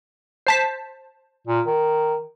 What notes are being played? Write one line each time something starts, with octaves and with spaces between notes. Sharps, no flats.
C5 A5 B6
A#2
D#3